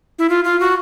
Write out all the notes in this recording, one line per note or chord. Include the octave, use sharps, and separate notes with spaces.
E4
F4
F4
F#4